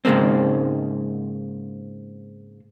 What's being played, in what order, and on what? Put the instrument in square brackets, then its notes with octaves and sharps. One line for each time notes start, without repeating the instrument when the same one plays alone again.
[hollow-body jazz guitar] G#2 C#3 G#3 A#3 C4